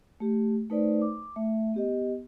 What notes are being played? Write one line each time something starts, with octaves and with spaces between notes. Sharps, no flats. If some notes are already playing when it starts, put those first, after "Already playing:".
A3 G4
A3 D#4 B4 C5 D5
D6
A3 E5
B3 G4 D#5